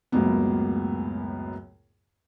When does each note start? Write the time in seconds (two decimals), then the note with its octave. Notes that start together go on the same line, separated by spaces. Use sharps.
0.12 C#2 F#2 A2 A#3 B3